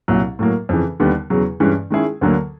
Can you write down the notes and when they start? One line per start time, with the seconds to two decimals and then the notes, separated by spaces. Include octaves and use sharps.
0.08 C2 A#2 F#3
0.39 A2 F#3 A#3
0.69 F2 C#3 E3
1.00 D#2 D3 G3 B3
1.30 E2 C#3 F#3
1.60 G2 E3 G#3 C#4
1.90 D#3 G#3 C#4 E4 G#4
2.21 D2 D3 F#3 A#3